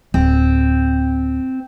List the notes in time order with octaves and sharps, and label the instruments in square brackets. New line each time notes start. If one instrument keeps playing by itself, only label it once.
[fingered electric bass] D1 [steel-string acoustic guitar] C4